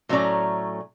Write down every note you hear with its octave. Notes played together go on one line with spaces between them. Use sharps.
A2 F#3 A3 C#4 D5 A#5